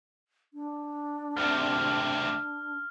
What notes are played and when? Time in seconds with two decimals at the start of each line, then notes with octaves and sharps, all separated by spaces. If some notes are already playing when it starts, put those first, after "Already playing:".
0.54 D4
1.37 D2 C3 F6